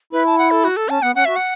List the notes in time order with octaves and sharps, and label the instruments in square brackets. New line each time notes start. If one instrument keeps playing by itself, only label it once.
[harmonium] E4 [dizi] B4
[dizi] A5
F#5
A4
F#4
A4
[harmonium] C#4 [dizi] A5
[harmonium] B3 [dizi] F#5
[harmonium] C#4 [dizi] F#5
[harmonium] F#4 [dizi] E5
[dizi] F#5